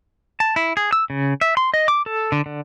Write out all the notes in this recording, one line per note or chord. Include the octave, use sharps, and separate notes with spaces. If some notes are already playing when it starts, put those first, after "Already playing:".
A5
E4
G#4
E6
C#3
E5
C6
D#5
D6
A4
D3
D3